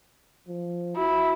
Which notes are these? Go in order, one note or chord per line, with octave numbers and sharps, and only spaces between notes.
F3
E4 F#4